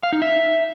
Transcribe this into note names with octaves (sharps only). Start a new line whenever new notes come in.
F5
D#4
E5